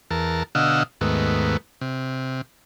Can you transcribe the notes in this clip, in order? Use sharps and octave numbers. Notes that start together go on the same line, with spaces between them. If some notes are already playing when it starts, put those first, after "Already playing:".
E2 A#4 A5
B2 D3 D#5 F5 F#5 E6
D#2 G#2 A3 B3
C3